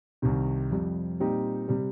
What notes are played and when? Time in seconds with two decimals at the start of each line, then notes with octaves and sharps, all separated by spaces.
0.22 C2 C3 D#3
0.71 F2 C3 G3
1.20 A#2 G3 C4 D#4 G4
1.68 C3 G3